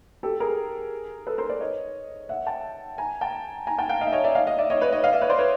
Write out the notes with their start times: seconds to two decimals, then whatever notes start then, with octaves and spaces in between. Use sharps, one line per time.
0.23 G4 A4
0.40 G#4 A#4
1.27 A4 B4
1.38 A#4 C5
1.49 C5 D5
1.60 C#5 D#5
2.29 E5 F#5
2.46 G5 A5
2.98 G#5 A#5
3.21 G5 A5
3.67 G#5 A#5
3.78 G5 A5
3.89 F5 G5
4.01 D#5 F5
4.07 E5
4.12 C#5 D#5
4.24 D5 E5
4.35 D#5 F5
4.47 D#5 F5
4.58 D5 E5
4.70 C#5 D#5
4.81 B4 C#5
4.92 C#5 D#5
5.04 D#5 F5
5.12 D5 E5
5.21 B4 C#5
5.30 C5 D5
5.39 B4 C#5